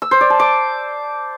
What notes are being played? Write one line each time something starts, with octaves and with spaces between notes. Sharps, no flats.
E6
C5
D5
A5
D6